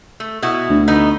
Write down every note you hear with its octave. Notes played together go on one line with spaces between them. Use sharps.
A3
B2 E4 F#4
D2
A3 B3 D#4